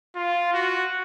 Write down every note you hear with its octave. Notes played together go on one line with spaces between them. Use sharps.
F4
F#4